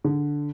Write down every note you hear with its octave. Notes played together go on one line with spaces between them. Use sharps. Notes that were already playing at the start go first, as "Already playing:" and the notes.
D3